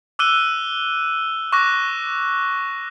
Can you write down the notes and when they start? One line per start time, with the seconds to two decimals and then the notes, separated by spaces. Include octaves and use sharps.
0.19 D6 E6 F#6 D#7 G7
1.52 C#6 D6 F#6 A#6